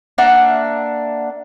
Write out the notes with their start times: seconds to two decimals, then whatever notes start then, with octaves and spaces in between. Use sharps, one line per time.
0.18 A#3 D4 E5 F#5